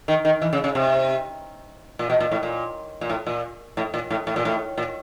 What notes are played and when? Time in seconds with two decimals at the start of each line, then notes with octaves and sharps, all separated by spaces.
0.08 D#3
0.25 D#3
0.42 E3
0.53 C#3
0.64 C#3
0.75 C3
1.99 A#2
2.10 B2
2.20 A#2
2.31 A2
2.43 A#2
3.01 A#2
3.10 A2
3.27 A#2
3.77 A2
3.94 A#2
4.10 A2
4.27 A2
4.36 A#2
4.45 A2
4.78 A#2